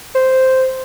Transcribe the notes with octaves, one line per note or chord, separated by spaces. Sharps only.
C5